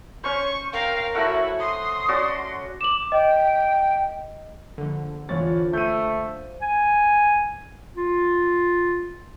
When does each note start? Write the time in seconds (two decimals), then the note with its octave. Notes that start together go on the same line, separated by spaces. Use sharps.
0.24 C#4 C5 C#6
0.73 A#4 F5 G5
1.15 A3 E4 F#4 F#5
1.60 C6 D#6
2.08 C#4 F#4 D5
2.81 D6 E7 F#7
3.12 D#5 G5
4.78 A#1 D3
5.29 E2 F3 C#5 D5 A6
5.73 A3 G6 D#7
6.62 G#5
7.96 F4